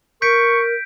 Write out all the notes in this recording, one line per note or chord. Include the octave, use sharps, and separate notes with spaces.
A#4 C#6 G6 B6 D7